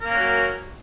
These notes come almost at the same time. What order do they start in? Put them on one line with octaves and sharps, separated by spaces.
A#4 A#3 C#4 F#4 F#3